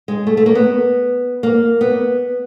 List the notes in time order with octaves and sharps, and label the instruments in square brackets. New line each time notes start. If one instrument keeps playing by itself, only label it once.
[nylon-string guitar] G#3
A3
A3
A#3
B3
A#3
B3